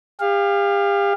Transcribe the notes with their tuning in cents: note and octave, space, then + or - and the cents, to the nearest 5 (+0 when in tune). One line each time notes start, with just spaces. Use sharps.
G4 +40 F5 +0